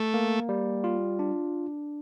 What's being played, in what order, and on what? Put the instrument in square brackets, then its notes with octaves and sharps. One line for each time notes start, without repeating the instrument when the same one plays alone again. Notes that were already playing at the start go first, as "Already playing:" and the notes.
Already playing: [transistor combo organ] A3
[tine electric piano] A#3
G3
F4
D4